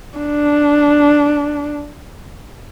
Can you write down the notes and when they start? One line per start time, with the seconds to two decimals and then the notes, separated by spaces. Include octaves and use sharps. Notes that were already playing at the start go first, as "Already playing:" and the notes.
0.18 D4